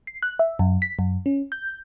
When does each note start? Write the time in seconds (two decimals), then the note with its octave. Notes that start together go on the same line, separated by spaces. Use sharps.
0.07 C7
0.23 F#6
0.39 E5
0.59 F#2
0.82 B6
0.99 F#2
1.26 C#4
1.52 G6